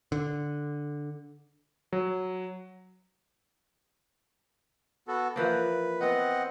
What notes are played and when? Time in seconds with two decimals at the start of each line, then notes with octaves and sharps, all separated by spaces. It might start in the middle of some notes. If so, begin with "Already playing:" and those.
0.12 D3
1.93 F#3
5.08 B3 F#4 A4
5.36 E3 F3 A#3 B4
6.01 B3 C4 B4 D#5 F#5